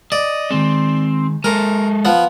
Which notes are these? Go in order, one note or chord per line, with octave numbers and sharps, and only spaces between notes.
D5 D#5
D#3 G#3 C4
G#3 A4 A#4 C5
F3 B3